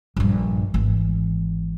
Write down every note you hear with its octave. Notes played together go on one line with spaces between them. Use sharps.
A#1 G2
G#1 E3